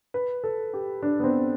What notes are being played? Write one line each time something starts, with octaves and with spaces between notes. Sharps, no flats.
B4
A4
G4
D4
B3
C4